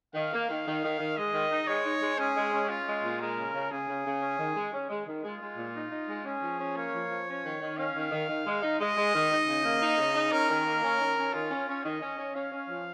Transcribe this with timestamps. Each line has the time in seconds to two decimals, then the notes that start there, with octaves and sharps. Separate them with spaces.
0.15 D#3 F5
0.32 A#3
0.49 D#3
0.66 D#3
0.83 D#3
0.99 D#3
1.17 G#3 D#5
1.34 D#3
1.51 D#4
1.67 G#3 C#5
1.85 D#4
2.01 G#3
2.18 C#4 G#4
2.35 G#3
2.52 C#4
2.69 C#4 F4
2.87 G#3
3.03 A#2
3.20 G#3 A#4
3.37 C#3
3.54 C#3
3.71 C#3 G#4
3.88 C#3
4.05 C#3
4.22 C#4
4.38 D#3
4.56 G#3
4.73 C#4
4.90 G#3
5.06 D#3
5.23 G#3 F4
5.40 G#3
5.57 A#2
5.75 D#4
5.91 D#4
6.08 G#3
6.25 C#4 G#4
6.42 F3
6.59 C#4
6.76 A#3 C#5
6.93 F3
7.09 F3
7.27 C#4
7.44 D#3
7.60 D#3
7.77 C#4 F5
7.95 D#3
8.12 D#3
8.28 D#3
8.46 G#3
8.63 D#4
8.79 G#3 D#5
8.96 G#3
9.13 D#3
9.31 D#4
9.47 C#3
9.64 A#3
9.81 D#4
9.98 C#3
10.14 D#4
10.32 C#4 A#4
10.49 D#3
10.66 A#3
10.83 C#4
11.00 D#3
11.17 C#4
11.33 D#3 F4
11.51 C#4
11.68 C#4
11.84 D#3 D#5
12.01 C#4
12.18 C#4
12.35 C#4 F5
12.52 C#4
12.69 F3